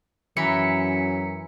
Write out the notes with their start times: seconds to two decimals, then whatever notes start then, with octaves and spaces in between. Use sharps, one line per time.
0.37 F#2 E3 A#5 B6 C#7